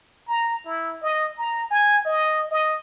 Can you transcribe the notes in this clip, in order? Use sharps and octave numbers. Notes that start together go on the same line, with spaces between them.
A#5
E4
D#5
A#5
G#5
D#5
D#5